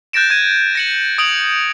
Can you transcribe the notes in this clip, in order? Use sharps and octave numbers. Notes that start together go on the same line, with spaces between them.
F#6 G6 A6 A#6 D7 E7
G#6 D#7
A#6 C#7 F#7
D#6 D7 F7 F#7